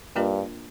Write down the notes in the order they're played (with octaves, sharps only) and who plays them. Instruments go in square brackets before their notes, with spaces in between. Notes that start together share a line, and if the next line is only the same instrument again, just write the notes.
[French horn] G2 [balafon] A#3 D4 F4 A#4 D#5